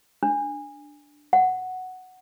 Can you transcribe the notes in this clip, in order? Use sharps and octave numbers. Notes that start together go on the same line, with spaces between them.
D4
F#5